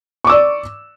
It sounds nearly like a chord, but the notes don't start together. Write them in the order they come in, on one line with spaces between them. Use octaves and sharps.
C#6 D6 E6 D5